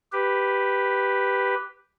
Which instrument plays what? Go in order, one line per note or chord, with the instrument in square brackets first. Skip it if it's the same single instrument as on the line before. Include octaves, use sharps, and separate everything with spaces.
[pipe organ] G4 B4